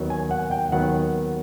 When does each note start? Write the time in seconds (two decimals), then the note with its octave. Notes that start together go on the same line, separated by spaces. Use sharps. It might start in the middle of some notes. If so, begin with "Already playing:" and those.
Already playing: D#2 D#3 F#3 B3
0.10 G#5
0.31 F#5
0.51 G5
0.72 D#2 D#3 F#3 B3 F#5